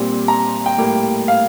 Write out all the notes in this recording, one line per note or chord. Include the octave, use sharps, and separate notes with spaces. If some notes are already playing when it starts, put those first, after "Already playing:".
Already playing: A#2 G3 C4
A#5
G5
A2 G3 A#3
F5